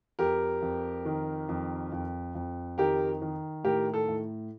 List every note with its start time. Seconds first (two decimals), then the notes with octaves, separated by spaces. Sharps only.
0.19 F2 G4 A#4
0.62 F2
1.05 D#3
1.49 F2
1.92 F2
2.35 F2
2.78 D#3 G4 A#4
3.22 D#3
3.64 A2 G4 A#4
3.94 A4
4.08 A2